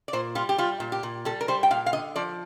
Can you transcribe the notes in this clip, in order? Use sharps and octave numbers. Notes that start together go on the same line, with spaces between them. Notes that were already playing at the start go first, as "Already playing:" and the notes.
D5
A#2 C5
G3 F4
G4
G3 F4
A#2
G4
A#2
G3 A4
A#4
G3 C5
G5
A#2 F5
F5
D3 D#5
F3 D5